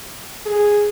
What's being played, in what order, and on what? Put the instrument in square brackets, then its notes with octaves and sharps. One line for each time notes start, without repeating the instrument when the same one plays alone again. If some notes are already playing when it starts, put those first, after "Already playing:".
[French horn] G#4